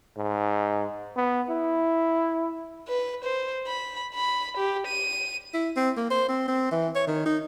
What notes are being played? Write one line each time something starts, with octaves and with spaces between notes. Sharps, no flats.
G#2
B3
E4
B4
C5
B5
B5
G4
D#7
E4
C4
A#3
C5
C4
C4
E3
C#5
D#3
D#4